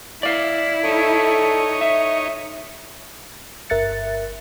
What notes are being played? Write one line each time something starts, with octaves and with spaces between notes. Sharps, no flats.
E4 D5 F5
D#4 A4 C#5
E5
G1 A#4 E5 F#6 A6 C#7